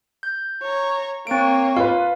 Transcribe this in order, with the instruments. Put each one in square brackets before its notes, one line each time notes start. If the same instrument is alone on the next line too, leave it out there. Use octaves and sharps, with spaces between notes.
[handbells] G6
[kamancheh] C#5 A#5
[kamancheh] A#3 C#5 [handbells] C4 D7
[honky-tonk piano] F4 B4 [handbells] F5